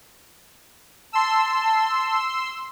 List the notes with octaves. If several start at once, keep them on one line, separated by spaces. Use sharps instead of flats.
A5 C6 E6